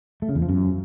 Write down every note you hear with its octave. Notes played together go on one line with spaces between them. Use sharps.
A3
C#3
E2
F3
F#2